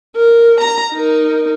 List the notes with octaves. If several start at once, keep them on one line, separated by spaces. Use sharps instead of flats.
A#4
A#5
D#4 A#4